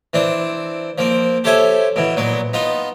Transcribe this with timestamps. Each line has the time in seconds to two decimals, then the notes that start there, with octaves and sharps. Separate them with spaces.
0.13 E3 C4 D4
0.98 F3 A#3 C4
1.44 G4 A4 C5 C#5 E5 G#5
1.96 B2 E3
2.16 A#2 F#3 B3
2.53 B3 D#4 F4